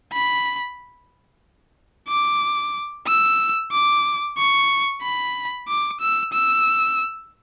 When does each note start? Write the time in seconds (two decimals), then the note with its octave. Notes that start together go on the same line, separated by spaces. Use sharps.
0.13 B5
2.09 D6
3.07 E6
3.72 D6
4.38 C#6
5.03 B5
5.68 D6
6.01 E6
6.33 E6